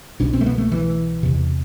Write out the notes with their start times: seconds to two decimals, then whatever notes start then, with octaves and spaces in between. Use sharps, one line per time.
0.20 C2 B2 D4
0.33 C4
0.41 A3
0.46 B3
0.58 A3
0.72 E3
1.23 E2 C3